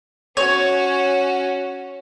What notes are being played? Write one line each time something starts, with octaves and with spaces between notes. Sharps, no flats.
C#4 F#4 C#5